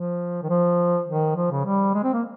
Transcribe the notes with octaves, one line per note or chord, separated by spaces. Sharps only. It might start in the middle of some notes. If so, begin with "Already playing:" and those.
Already playing: F3
D#3
F3
D#3
F3
C#3
G3
G#3
C4
A#3